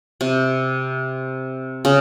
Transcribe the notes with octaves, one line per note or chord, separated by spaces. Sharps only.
C3
C#3